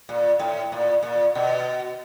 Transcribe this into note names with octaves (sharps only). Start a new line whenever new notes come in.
A#2
A2
A#2
A#2
B2